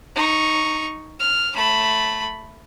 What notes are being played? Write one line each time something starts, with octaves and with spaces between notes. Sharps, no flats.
D#4 C#6
F6
A3 B5